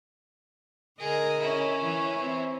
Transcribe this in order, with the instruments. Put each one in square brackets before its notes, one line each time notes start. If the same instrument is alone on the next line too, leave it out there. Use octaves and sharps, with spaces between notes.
[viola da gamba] D3 A#4 D#5 [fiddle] G#4
[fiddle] C#4 E4
[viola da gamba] E3
C4